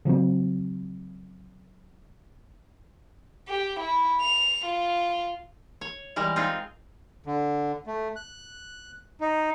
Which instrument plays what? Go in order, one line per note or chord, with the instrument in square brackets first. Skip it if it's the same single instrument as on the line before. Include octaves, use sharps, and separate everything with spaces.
[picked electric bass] C#3 F3 F#3 C4
[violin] G4
E4
F7
F4
[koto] C#5
E3 G3 G#3 A#4
C4 D#4 F4 G#4
[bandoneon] D3
A3
F#6
D#4